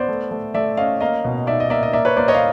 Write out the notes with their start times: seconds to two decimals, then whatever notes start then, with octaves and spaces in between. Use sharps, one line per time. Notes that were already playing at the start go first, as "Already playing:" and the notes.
Already playing: B3 C5 D5
0.08 A3
0.31 A3
0.54 A3 D5 E5
0.77 C#4 D#5 F5
1.01 A#3 D#5 F5
1.24 B2
1.47 D#4 D5 E5
1.60 D#5
1.70 A#3 D5 E5
1.83 D#5
1.93 A#3 D5 E5
2.05 B4 C#5
2.17 A#3 C5 D5
2.28 C#5 D#5
2.35 F5